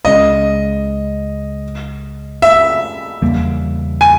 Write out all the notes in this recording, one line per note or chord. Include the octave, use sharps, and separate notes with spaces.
C#2 C#3 G#3 C#4 D#5
E5
E2 C#3 G3 A#3
G#5